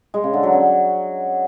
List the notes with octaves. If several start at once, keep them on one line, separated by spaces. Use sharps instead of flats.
G#3
C#3
D3
F#3
C#4